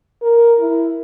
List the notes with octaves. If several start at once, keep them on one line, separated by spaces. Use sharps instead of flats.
A#4
E4